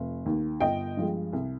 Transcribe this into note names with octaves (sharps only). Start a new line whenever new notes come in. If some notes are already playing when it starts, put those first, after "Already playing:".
Already playing: F1
D#2 D#3
G1 D#5 G5
G2 F3 G#3
C2